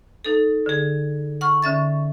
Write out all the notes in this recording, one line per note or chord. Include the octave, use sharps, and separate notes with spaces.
D#4 A4
D3 G#4
F#5 C#6 F6
D3 C#4 E5 A6